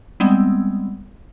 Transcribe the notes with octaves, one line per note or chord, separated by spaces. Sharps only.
G3 G#3 B3 C4